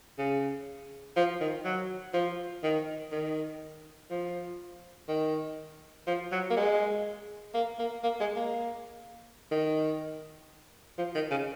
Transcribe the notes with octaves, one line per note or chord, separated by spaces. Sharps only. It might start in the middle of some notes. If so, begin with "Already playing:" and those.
C#3
F3
D#3
F#3
F3
D#3
D#3
F3
D#3
F3
F#3
A#3
G#3
A#3
A#3
A#3
G#3
A#3
D#3
F3
D#3
C#3